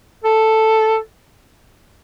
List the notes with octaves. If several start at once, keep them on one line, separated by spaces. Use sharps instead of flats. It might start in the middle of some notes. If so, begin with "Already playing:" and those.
A4